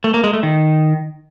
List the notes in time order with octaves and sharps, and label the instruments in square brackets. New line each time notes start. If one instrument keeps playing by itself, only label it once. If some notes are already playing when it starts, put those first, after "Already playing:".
[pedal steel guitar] A3
A#3
G#3
A3
D#3